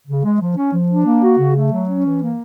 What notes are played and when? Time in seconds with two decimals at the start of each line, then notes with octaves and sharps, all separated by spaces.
0.08 C#3
0.24 G#3
0.40 F3
0.56 C#4
0.73 F3
0.89 D4
1.06 A#3
1.22 F#4
1.39 C#3
1.55 A3
1.71 F#3
1.89 C#4
2.05 E3
2.22 A#3